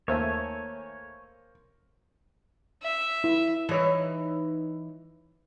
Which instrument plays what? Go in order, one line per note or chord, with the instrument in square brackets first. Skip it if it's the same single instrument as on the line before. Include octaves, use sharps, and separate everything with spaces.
[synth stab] D#2 A3 [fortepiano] A#3 [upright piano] C5 [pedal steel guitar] C#5 G#5
[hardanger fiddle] E5
[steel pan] E4
[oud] E3 D#4 C#5